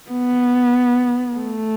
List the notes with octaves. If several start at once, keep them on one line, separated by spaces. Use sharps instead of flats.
B3
A3